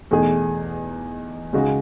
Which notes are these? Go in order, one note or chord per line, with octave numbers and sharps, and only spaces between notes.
E2 B2 A3 D#4 G#4
C#2 C#3 G#3 D#4 F#4